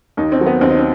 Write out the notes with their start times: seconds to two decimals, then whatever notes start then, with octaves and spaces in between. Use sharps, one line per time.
0.17 D#2 D#4
0.32 C4
0.39 D#3 F#3
0.46 B3
0.61 D#2 C4
0.69 D#4
0.79 C4